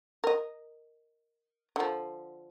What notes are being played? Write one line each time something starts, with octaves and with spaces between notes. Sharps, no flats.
A#4 D#5
D3 F3